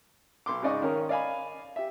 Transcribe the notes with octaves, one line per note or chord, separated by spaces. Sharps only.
B1 C6 D6
G#2 C#3 D5 D#5 C#6
D#3 C#4 A#4
D5 D#5 F5 G#5 B5
G4 E5